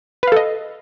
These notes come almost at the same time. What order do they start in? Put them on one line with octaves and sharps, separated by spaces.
B4 F5 A4 D#5